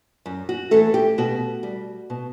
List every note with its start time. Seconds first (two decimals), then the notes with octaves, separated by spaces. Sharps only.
0.26 F#2
0.49 F#4
0.71 E3 A3 A4
0.94 G4
1.18 B2 F#4
1.63 G3
2.10 B2